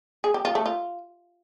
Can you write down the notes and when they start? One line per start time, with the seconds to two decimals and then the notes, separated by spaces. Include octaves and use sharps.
0.24 G#4
0.34 G4
0.45 F4
0.55 A3
0.66 F4